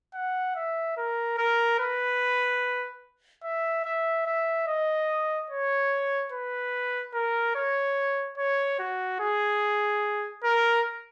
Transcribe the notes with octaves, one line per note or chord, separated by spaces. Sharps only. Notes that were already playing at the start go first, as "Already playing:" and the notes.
F#5
E5
A#4
A#4
B4
E5
E5
E5
D#5
C#5
B4
A#4
C#5
C#5
F#4
G#4
A#4